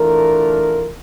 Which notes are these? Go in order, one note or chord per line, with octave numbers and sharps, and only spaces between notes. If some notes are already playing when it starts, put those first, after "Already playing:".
Already playing: E3 A3 D4 F4 A#4